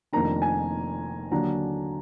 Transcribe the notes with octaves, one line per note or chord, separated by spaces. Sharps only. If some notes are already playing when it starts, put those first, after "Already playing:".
F1 F2 D#3 A#3 D4 A#5
G#5
D#2 D3 F#3 D4 A#5